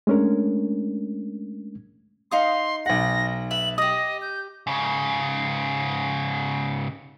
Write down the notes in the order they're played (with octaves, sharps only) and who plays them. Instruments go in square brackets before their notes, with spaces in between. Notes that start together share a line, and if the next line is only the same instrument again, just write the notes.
[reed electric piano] G#3 A3 C#4 D4 A#4
[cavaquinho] D#4 F5 D#6 [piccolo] C6
[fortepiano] B1 F#5 [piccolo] A#6
[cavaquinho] B4 E5 [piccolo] F#7
[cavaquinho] G4 D#6 [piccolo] D#5
[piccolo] G6
[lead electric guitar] G#2 C#3